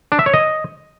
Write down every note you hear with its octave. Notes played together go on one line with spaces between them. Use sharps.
D4
E5
C#5
D#5